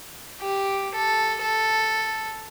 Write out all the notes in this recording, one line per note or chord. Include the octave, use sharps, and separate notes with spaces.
G4
A4
A4